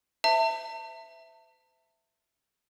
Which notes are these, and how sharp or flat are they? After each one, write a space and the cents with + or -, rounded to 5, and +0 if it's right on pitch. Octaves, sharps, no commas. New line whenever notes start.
C5 -45 E5 +0 A5 +40